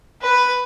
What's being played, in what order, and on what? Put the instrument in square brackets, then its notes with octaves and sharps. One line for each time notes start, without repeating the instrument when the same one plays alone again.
[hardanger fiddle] B4